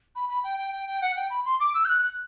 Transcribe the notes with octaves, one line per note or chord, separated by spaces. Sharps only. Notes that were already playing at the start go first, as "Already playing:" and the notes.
B5
B5
G5
G5
G5
G5
F#5
G5
B5
C6
D6
E6
G6
F#6
F#6